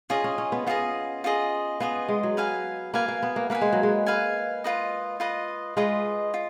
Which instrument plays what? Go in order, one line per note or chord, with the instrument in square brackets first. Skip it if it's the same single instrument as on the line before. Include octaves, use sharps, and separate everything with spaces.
[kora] C#4 [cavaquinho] F4 G#4 D#5
[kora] C#4
C#4
B3
[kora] B3 [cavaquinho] F4 G#4 D#5
[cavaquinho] F4 G#4 D#5
[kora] B3 [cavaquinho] F4 G#4 D#5
[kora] G#3
F#3
[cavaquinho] B4 F5 G#5
[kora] A#3 [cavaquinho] B4 F5 G#5
[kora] A#3
B3
A#3
[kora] A#3 [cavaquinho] B4 F5
[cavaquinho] G#5
[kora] G#3
F#3
G#3
[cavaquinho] B4 F5 G#5
F4 B4 D#5
F4 B4 D#5
[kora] G#3 [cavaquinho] F4 B4 D#5
[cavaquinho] F4